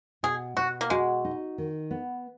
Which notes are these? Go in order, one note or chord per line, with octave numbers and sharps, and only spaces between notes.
B2 G#4
B2 F#4
A#3
G#3 F#4
D#4
D#3
B3